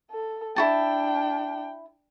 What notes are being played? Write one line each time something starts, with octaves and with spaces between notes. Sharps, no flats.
A4
D4 E4 F#4 G5 A5